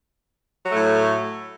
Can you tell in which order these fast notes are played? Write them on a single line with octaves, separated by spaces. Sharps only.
F#3 A3 A2